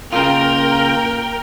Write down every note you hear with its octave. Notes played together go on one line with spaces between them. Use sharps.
C#3 A#3 F4 A#4 G5